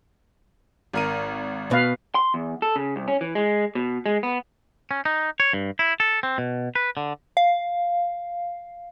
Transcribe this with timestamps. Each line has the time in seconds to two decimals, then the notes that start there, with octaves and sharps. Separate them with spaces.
0.93 G#1 A#4 D#7
1.71 B2 B4 F5
2.15 C6
2.34 E2
2.62 A4
2.76 C#3
2.96 C2
3.08 C#4
3.21 E3
3.35 G#3
3.75 B2
4.06 G#3
4.23 B3
4.91 C#4
5.05 D#4
5.40 C#5
5.53 G2
5.79 E4
6.00 A4
6.23 C4
6.38 B2
6.75 B4
6.97 D3
7.37 F5